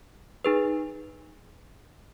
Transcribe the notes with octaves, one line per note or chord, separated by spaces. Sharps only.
D#4 G#4 B4